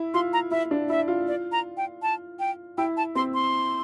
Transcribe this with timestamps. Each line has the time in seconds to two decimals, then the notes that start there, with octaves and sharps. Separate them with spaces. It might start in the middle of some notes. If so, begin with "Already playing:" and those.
Already playing: E4
0.14 F4 C6
0.33 A#5
0.51 E4 E5
0.71 D4
0.89 E4 E5
1.08 F4
1.27 D5
1.52 A#5
1.77 G5
2.02 A5
2.40 G5
2.78 E4 G5
2.97 A5
3.15 C4 C6
3.34 C6